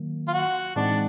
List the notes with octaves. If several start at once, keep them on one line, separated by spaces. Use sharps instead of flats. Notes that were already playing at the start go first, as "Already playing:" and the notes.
Already playing: D#3 F#3 A#3
F4
F#4
A2 E3 G#3 C4 D4 D#4